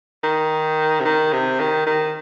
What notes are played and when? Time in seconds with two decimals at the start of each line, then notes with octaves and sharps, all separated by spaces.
0.24 D#3
1.00 C3
1.05 D#3
1.33 C3
1.60 D#3
1.87 D#3